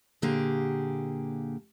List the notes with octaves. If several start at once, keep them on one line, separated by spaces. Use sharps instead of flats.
A#2 D3 A#3 G4 G#4